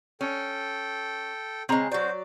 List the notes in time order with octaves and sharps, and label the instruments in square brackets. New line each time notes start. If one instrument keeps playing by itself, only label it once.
[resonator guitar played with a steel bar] C#4 [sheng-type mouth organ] A4 G5
[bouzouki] C#3 G#3 [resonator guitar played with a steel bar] C4 A#5
[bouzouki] F#3 D5 [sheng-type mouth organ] F#4 C5